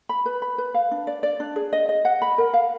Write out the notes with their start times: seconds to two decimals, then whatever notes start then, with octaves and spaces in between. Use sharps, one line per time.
0.09 B5
0.26 B4
0.42 B5
0.58 B4
0.74 F5
0.91 D4
1.07 D5
1.23 D5
1.40 D4
1.56 G#4
1.73 D#5
1.89 D#5
2.05 F#5
2.22 B5
2.38 A#4
2.53 F5